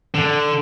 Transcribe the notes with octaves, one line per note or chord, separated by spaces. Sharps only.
D3